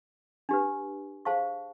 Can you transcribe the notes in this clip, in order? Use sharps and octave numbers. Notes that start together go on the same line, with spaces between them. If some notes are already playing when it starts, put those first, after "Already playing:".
D4 G4 B4
G#4 C5 F5 A5 C#6